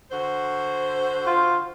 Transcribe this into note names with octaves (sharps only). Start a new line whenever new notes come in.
D3 F#4 C5
F4